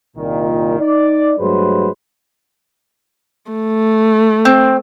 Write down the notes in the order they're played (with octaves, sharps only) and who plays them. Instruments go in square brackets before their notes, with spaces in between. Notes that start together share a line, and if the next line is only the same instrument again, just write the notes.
[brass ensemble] C2 A#2 D#3
D#4 D5
G2 F#3 G#3 A3 B4 C5
[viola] A3
[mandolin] C4